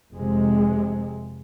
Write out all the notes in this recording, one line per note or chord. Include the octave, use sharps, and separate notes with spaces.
F1 C3 G#3